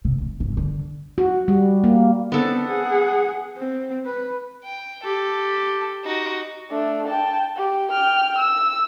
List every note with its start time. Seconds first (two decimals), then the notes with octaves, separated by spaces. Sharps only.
0.05 C3
0.21 C3
0.40 G1
0.57 D3
1.18 F#4
1.48 G3
1.84 A#3
2.32 B3 C4 D4 A4
2.67 G#4 F#5
3.57 C4
4.06 B4
4.64 G5
5.05 G4 A4
6.04 D#4 F#4
6.71 A3 D4
7.07 G5 A5
7.57 G4
7.91 G5 F6
8.38 E6